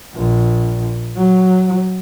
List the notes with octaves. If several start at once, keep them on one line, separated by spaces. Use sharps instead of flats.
A#1
F#3